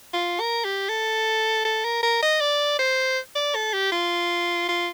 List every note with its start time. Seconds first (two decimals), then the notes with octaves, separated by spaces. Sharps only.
0.14 F4
0.40 A#4
0.65 G4
0.89 A4
1.65 A4
1.84 A#4
2.03 A#4
2.22 D#5
2.40 D5
2.79 C5
3.35 D5
3.55 A4
3.73 G4
3.92 F4
4.69 F4